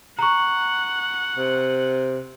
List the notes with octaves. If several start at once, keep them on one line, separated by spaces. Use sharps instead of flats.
F#5 A#5 C#6
C3